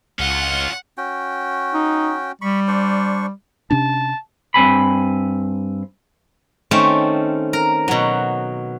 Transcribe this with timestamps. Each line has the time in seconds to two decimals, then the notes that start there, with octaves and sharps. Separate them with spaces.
0.19 C#2 C#4 F4 F#5
0.98 C#4 F#4 G5
1.74 D#4
2.42 G3 B5 C#6
2.68 D4 C5 C#6
3.71 C3 C#4 D4 A5
4.54 G2 C4 G#5 B5
6.71 D#3 A3 C4 C#4
7.53 A#4
7.88 B2 F#3